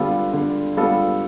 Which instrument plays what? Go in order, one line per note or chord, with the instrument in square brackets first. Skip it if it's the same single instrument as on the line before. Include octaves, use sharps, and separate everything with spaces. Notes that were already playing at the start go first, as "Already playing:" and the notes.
Already playing: [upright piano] D3 G3 B3 F4 A4
D3
G3 B3 F4 A4